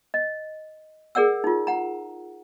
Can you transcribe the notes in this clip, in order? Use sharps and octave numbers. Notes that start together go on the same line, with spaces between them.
D#5
G#4 A#4 D5 F#5 E6
D#4 F4
F#5 A#5